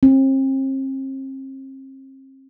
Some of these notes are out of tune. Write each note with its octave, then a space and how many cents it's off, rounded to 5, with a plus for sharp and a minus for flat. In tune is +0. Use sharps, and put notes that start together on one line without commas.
C4 +40